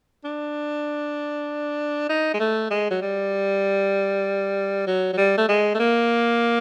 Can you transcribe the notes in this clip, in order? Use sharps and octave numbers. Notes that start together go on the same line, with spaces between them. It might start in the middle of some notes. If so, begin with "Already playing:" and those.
D4
D#4
G#3
A3
G#3
F#3
G3
F#3
F#3
G3
A3
G#3
A3
A#3